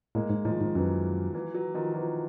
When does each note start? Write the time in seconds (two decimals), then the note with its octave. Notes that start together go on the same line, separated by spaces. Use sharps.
0.15 A2 G#3 A#3
0.30 G#2
0.45 A2 D#3 F3
0.61 G#2
0.75 F#2 E3 F#3
1.34 E3 F#3
1.54 E3 F#3
1.74 D#3 F3
1.94 E3 F#3